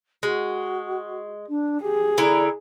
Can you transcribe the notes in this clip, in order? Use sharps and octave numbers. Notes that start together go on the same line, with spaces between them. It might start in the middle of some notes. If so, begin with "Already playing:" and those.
G#3 F#4
D4
G4 G#4
D3 E4 D5 A#5